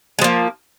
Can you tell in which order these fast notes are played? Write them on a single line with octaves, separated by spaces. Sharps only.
G#3 F3 A#3